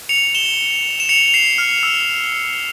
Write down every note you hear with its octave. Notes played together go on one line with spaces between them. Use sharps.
C#7 F7
E7 G7
E7
C#7 F7
F7
C7 E7
F6
E6